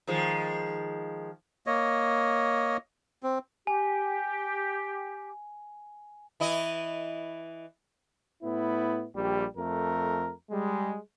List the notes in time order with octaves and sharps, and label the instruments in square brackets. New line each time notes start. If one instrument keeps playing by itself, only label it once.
[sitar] D#3 F3 G#3
[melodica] A#3 C#5 D#5
C4
[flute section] G4 [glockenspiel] G#5
[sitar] E3 E4 D#5
[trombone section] A2 B3 E4
A#1 G3 G4
F2 A3 A#4
G3 G#3